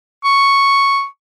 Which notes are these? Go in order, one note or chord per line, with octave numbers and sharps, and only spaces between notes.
C#6